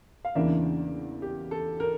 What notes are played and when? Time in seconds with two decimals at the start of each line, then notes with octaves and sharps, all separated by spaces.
0.25 F5
0.35 E2 C#3 E3 A#3 D4 E5
1.22 G4
1.51 A4
1.80 A#4